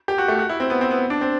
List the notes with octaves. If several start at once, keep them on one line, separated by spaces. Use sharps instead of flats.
G4
F#4
A3
F#4
E4
C4
B3
C4
B3
D4
C4